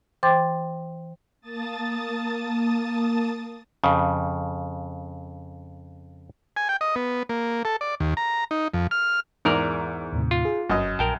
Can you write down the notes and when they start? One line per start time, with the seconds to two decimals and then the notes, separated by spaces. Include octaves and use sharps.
0.23 E3 C5 G5 C6 D6 A6
1.41 A#3 A5 D#6 A6
3.84 F2 C#3
6.57 G#5
6.69 G5
6.81 D#5
6.96 B3
7.29 A#3
7.65 A4
7.81 D5
8.00 D#2
8.17 A#5
8.51 D#4
8.74 F2
8.91 F6
9.45 E2 G#2 A#4 D5
10.13 D#2 A2 C3
10.31 F4
10.45 G#4
10.70 G1 F#2 D#5
10.99 A#1 A#4 G5 A5